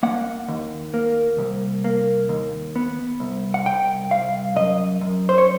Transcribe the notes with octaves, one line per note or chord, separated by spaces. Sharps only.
A#3 F#5
D#2
A#3
C2
A#3
D#2
B3
C2
F#5
C2 G5
C2 F5
F#2 D#5
F#2
C5
C#5